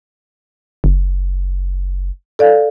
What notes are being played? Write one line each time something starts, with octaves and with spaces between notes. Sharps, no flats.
F#1
A4 D5 F5